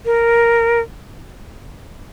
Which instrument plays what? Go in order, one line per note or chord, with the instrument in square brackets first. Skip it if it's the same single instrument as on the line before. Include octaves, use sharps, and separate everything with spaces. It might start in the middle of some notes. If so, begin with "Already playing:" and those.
[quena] A#4